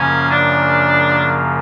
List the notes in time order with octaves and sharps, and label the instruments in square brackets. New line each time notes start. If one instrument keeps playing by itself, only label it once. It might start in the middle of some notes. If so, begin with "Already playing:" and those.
Already playing: [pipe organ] F#2 C#3 F3 A#3 [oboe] C#4
[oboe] D4